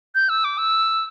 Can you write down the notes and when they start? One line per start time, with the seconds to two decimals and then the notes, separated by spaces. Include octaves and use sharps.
0.15 G6
0.29 E6
0.44 D6
0.58 E6